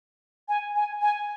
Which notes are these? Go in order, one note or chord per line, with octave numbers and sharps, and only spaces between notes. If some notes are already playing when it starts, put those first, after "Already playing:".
G#5
G#5
G#5